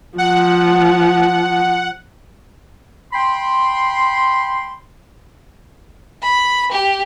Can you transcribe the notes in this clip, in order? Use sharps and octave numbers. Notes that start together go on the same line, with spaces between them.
F3 F#5
G5 B5 C6
B5
G4